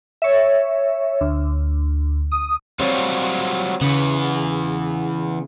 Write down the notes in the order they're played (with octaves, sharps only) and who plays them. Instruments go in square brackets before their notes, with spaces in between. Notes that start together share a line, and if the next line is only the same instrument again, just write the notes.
[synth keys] C#5 E5
D2
D#6
[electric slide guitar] F#3 G3 F4 [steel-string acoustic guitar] C4 C#5
[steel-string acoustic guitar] C#3 [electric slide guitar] E3 B3